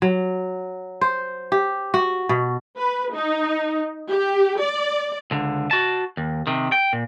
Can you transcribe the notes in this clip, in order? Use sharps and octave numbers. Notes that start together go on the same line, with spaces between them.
F#3
C5
G4
F#4
B2
B4
D#4
G4
D5
C#2 D3
F#4 A5
D#2
C3 D#3
G5
A#2